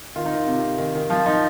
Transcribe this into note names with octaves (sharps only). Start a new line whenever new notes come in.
D#3 F4
D#4
D#3
F4
C3
C3
D#3
D#3
F3 F4
F3 D#4